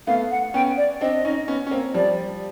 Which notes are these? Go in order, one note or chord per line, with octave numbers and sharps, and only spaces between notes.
A3 B3 F5
F#5
B3 C#4 G5
D5
C4 D4 D#5
C#4 D#4
B3 C#4
C#4
A#3 C4
F3 G3 D5